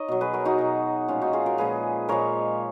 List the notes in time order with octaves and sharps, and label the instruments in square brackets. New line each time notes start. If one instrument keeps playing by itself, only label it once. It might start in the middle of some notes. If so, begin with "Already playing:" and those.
Already playing: [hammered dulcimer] D#4 C#5 D#5
B2 F#3
G#4 B4
F#4 A#4
D#4 F#4
B2 F#3
A#2 F3 G#3 C#4 F4
D#4 F#4
F4 G#4
F#4 A#4
A#2 F3 G#3 G#4 B4
A#2 F3 G#3 A#4 C#5